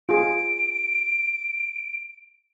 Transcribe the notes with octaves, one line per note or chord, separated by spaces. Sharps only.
F4 G#4 D7